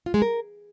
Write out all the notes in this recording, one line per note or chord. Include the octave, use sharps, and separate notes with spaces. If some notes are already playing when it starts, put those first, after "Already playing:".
F4
G#3
A#4